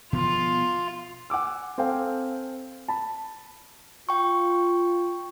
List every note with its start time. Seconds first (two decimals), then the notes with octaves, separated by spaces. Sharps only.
0.13 B2 F3 B3 F4
1.30 F#5 G#5 D6 E6
1.78 C4 A4 F5 G5 G#5
2.88 A5 B5
4.09 F4 G5 C#6